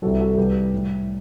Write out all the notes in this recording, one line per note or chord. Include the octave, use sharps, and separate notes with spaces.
C2 C3 E3 G3 F#4 A4
F#4 A4
C2 C3 G3 G4 B4
A2 G3